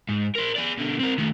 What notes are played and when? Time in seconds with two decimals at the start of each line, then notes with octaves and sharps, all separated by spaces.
0.09 G#2
0.35 A#4 C5
0.55 G#4 D5
0.77 B2 D3
1.00 C4 A#4
1.18 D#3 A3